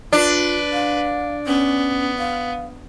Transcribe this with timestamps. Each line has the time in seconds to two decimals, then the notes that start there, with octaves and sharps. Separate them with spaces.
0.13 D4 F4 B4
0.73 F5
1.47 B3 C#4
2.19 F5